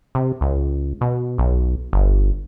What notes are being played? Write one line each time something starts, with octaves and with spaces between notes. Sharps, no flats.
C3
C#2
B2
B1
G1